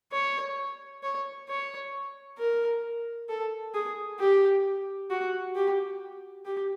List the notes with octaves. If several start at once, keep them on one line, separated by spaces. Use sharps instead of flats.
C#5
C#5
C#5
A#4
A4
G#4
G4
F#4
G4
G4